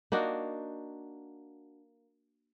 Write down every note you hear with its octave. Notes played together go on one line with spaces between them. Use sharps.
A#3 D4 D#4 F#4